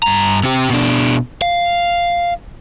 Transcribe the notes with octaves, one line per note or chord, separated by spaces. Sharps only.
G2 A#5
C3 G4
B2 D4
F5